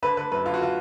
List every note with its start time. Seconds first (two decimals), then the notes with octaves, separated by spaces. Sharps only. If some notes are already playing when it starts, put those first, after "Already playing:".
0.03 D3 B4
0.17 D3 B4
0.32 F#2 B4
0.45 D3 F4
0.54 F#4
0.61 D3 F4